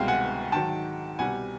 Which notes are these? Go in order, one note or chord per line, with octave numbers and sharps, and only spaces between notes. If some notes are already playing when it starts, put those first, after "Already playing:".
Already playing: C2 B2 G#3 F5 G5
F#5 G#5
G#2 D#3 F#3 G5 A5
C2 B2 G3 F#5 G#5